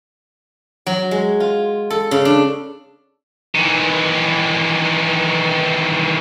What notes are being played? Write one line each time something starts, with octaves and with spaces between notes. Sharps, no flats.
F#3
G#3
F4
A4
C#3
D4
D#3 E3